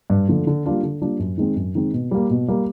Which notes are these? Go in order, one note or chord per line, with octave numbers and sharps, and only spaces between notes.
G2
D3 F3 A3
D3
G3 A#3 D4 F4
D3
G3 A#3 D4 F4
F#2
D#3 G#3 C4
F#2
D#3 G#3 C4
B2
G3 A#3
B2
G3 A#3